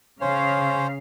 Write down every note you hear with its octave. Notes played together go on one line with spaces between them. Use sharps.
C#3 C#4 C5 C#5 F5